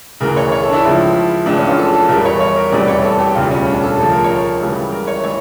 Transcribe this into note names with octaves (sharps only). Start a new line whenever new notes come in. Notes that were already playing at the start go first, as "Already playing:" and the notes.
D2 C#3 E3 A#4
C#5
C#5
A4
D4
E4
C#2 C#3 F3
C#2 C#3 E3 D4
C#4
F4
A4
A4
E2 E3 G3 A#4
C#5
C#5
A#4
F1 E2 E3 G3 D5
C#5
A4
G4
E1 D2 C#3 G3 F4
C#4
D4
A4
D2 C#3 F3 A4
A#4
C#5
A#4
C#2 C#3 E3 G3
A#4
C#5
E3 C#5